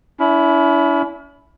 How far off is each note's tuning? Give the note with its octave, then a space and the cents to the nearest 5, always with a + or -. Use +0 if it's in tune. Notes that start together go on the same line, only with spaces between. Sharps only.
C#4 +45 E4 +0